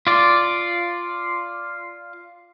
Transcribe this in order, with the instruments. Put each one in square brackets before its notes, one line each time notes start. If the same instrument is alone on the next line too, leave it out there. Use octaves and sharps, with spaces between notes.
[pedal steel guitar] F4 D5